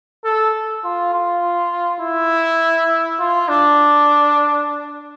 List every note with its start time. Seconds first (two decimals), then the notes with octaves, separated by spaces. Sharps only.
0.25 A4
0.84 F4
1.14 F4
2.01 E4
3.19 F4
3.48 D4